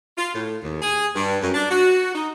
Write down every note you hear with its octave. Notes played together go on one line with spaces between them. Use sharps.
F4
A2
D#2
G#4
G2
F#2
D4
F#4
D#4